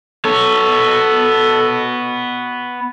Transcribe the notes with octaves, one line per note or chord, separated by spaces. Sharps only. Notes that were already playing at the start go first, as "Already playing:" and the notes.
B3 A4 C#5